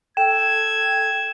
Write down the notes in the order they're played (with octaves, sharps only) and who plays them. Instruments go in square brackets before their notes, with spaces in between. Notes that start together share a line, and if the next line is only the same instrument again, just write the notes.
[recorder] A4 [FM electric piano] G5 [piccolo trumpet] G#6 [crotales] E7